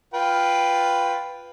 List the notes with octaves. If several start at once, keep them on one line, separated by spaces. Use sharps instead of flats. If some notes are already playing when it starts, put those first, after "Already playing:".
F4 B4 G5